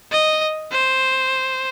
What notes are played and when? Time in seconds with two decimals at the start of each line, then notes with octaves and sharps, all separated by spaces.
0.12 D#5
0.72 C5